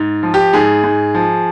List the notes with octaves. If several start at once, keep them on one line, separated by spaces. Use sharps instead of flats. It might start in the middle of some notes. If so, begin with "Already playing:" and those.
Already playing: G#2
F3
G4
G#2 G#4
G#2
F3